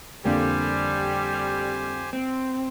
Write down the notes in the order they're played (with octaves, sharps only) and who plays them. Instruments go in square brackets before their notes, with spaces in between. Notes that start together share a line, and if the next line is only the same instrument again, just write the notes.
[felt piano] F2 D3 A#3 [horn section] G3 [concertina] G4 C5 G#5
[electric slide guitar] C4